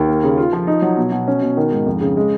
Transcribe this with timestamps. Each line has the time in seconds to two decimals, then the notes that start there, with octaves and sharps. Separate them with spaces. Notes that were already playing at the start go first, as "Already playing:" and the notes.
Already playing: D#2
0.08 A#3
0.23 C#3
0.38 F4
0.53 F3
0.67 D#4
0.82 F#3
0.97 B2
1.12 B2
1.28 C#4
1.42 B2
1.57 D#3
1.71 G#2
1.86 F2
2.01 C#3
2.17 G#3